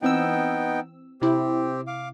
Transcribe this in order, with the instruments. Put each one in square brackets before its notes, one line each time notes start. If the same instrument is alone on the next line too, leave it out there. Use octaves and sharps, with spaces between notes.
[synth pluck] E3 C4 E6 [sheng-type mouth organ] B3 D#4 G5
[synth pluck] C3 E4 [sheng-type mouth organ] C4 G4
[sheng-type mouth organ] F5 D6